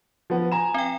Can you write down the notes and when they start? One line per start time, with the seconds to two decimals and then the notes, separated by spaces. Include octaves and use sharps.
0.30 F3 B3
0.52 G#5 A#5 E7
0.74 C4 G5